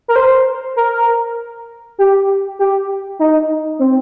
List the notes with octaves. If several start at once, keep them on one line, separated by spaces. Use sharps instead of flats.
A#4
C5
A#4
G4
G4
D#4
C4